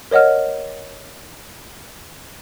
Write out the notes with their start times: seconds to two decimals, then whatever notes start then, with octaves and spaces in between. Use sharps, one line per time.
0.11 A#4 C#5 D#5 F#5 F6